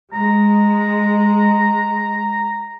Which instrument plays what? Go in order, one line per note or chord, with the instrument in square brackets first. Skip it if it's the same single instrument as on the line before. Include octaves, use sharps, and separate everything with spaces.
[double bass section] G#3 [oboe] A#5